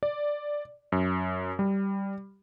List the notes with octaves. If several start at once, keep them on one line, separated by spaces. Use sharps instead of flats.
D5
F#2
G3